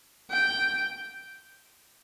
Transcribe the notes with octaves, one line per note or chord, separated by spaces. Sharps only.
G5